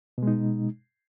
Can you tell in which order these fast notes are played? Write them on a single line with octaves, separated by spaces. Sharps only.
B2 G#3 D#4